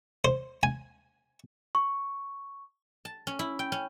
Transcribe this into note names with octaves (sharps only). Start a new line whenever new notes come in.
C5
G#5
C#6
A5
C#4
E4
G5
C#4